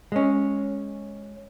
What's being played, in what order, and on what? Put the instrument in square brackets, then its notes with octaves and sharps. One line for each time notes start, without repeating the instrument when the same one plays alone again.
[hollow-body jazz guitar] G#3 C#4